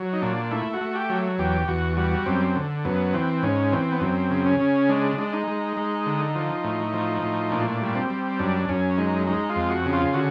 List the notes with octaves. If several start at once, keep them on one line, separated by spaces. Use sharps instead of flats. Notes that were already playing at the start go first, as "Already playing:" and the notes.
Already playing: F#3
D#4
A#2 D4
A3 E4
F#4
A3
G4
F#3
E2 G4
E2 F#4
G3 F#4
F#2 C4
D3
F#2 B3
E3 C4
G#2 C#4
E3 C4
B3
F#2 C4
C#3
C#4
C#3
G#3 D4
G#3 D4
D#4
G#3
G#3
D3
F3
A2
F3
A2
A#2 D4
G3
C4
G3
F#2 D4
F#2 C#4
G#3 D#4
G#3 D#4
F4
F2
F#4
C#3
F4
D3 F#4